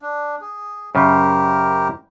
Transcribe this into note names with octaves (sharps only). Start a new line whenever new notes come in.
D4
G#4
F#2 C#3 G4 A#4 C5